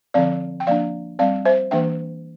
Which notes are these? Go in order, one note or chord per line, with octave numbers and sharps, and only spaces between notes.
D3 F3 C4 D5 F5
G5
F3 A#3 D4 D5 F5
G3 C4 D5 F5
C5 E5
E3 A#3 D4 E5 G5